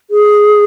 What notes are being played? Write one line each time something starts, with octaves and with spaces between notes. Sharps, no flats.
G#4